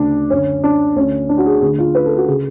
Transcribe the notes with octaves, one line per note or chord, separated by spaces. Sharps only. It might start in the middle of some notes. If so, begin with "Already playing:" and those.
Already playing: D2 C#3 D4
F#2 D3 C#4
D4
D2 D3 C#4
D4
F#4
G#4
D2 D3 G#4
F4
B4
A4
F#4
C#3 G#4